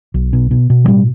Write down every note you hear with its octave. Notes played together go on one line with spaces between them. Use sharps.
B1
B2
B2
B2
E3
A2 G3